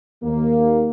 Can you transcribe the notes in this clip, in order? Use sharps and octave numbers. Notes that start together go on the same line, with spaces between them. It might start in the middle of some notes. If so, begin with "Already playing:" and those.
D#2 A#3